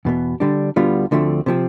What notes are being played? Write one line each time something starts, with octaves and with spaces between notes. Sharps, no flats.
E2 B2 B3
D3 G3 D4
D2 D3 G3 B3 F4
D2 D3 F3 A3 C4
C3 F3 C4